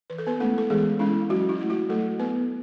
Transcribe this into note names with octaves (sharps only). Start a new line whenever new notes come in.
E3 B4
A4
B3 B4
G#3 A3 C#4 E4 A4
A4
E3 G#3 G#4
G#3 C#4 E4
F#3 F#4
E4
A3 E4
F#4
F#3 A3 A4
A3 B3 E4 B4